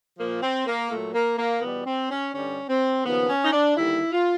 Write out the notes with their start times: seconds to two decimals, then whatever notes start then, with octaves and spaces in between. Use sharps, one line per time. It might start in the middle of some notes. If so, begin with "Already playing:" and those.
0.17 A#2 F3 A#3
0.41 C4
0.66 A#3
0.90 A#2 F#3 A3
1.13 A#3
1.37 A#3
1.61 E2 B2 G3 B3
1.85 C4
2.09 C#4
2.33 G2 D3 G3 C#4
2.68 C4
3.04 D#2 C#3 F3 B3
3.28 C#4
3.44 D#4
3.52 D4
3.76 D#2 D3 G3 E4
4.12 F4